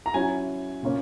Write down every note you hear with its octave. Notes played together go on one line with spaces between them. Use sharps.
A#5
F#3 C#4 E4 G#5
A#2 A#3 C#4